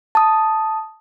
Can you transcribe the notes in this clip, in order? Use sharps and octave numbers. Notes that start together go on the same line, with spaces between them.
A5 D#6